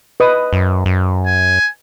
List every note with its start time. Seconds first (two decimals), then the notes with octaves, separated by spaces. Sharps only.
0.20 B4 D#5 D#6
0.53 F#2
0.86 F#2
1.26 G#5